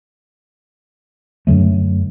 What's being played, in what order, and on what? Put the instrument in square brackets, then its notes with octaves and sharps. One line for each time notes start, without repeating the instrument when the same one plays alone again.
[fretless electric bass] F#2 D3 F#3 A3